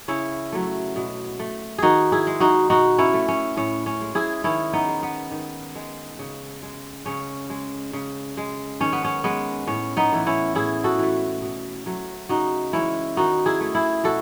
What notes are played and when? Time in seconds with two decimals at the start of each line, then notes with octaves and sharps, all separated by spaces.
0.08 C#3 C#4 E4
0.52 F#3 A3
0.96 B2
1.40 A3
1.78 D#3 D#4 F#4 G#4
2.12 E4 G#4
2.27 G#3
2.40 D#4 F#4
2.70 B2 D#4 F#4
2.98 C#4 E4
3.14 A3
3.28 C#4
3.57 A2 C#4
3.86 C#4
4.01 G#3
4.15 E4 G#4
4.44 D#3 C#4 E4
4.73 B3 D#4
4.88 G#3
5.03 B3
5.31 D#3
5.75 G#3
6.19 C#3
6.62 G#3
7.06 C#3 C#4
7.50 G#3
7.93 C#3
8.37 G#3
8.80 D#3 C#4
8.93 B3
9.05 C#4
9.24 G#3 B3
9.67 A2 C#4
9.97 B3 D#4
10.12 E3 A3
10.26 C#4 E4
10.55 A2 E4 G#4
10.84 F#4 A4
10.99 E3 A3
11.42 B2
11.86 F#3 A3
12.29 C#3 D#4 F#4
12.73 E3 G#3 C#4 E4
13.17 D#3 D#4 F#4
13.46 E4 G#4
13.60 A3
13.75 E4 G#4
14.04 B2 F#4 A4